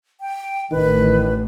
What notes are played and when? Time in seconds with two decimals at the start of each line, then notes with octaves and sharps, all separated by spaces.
0.21 G5
0.71 A1 A2 D#3 B4